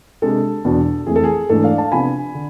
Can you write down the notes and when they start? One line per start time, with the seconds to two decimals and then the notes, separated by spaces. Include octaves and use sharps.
0.22 C3 G#3 D4 A4
0.64 E2 B2 B3 D4
1.06 F2 E3 A3 G#4
1.16 A4
1.24 G#4
1.49 G#2 E3 A3 D4 A4
1.64 D5 F5
1.78 F5 A5
1.92 C3 F3 B3 D4 G#5 B5
2.35 D3